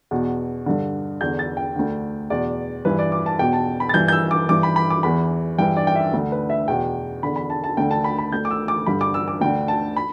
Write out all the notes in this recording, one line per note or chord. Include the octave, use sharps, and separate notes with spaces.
E2 B2
G2 D3
E2 D3 G6
A6
G5
D2 D3
E2 B2 D5
G2 E3 B4
D5
D6
A5
E2 B2 G5
A5
B5
A6
G2 E3 G6
G6
E6
D6
G2 E3 D6
B5
B5
D6
E2 E3 B5
G2 E3 G5
D5
G5
E5
D2 D3
B4
E5
E2 B2 G5
E2 D3 B5
B5
A5
A5
D2 D3 G5
A5
B5
B5
D2 D3 G6
D6
E6
D6
G2 D3 B5
D6
E6
D6
D2 D3 G5
A5
B5